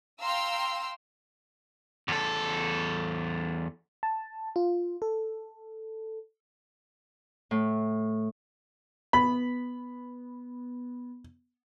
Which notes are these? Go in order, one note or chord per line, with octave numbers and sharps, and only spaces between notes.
F5 G5 A#5 C6 E6
E2 A4
A5
F4
A4
A2
B3 B5